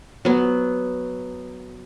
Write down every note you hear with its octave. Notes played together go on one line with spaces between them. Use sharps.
F#3 B3